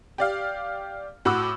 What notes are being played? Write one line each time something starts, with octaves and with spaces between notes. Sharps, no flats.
G4 D5 F5
A2 F#4 B5 D6 E6